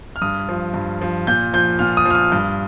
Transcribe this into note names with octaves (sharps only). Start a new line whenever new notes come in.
F6
G2 D#6
F3
G2
F3
A#2 G6
F3 G6
A#2 F6
D#6
F3
F6
D#6
G2